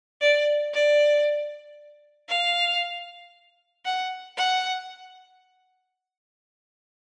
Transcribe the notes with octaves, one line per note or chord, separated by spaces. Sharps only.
D5
D5
F5
F#5
F#5